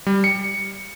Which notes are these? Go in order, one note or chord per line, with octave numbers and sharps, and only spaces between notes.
G3
C#7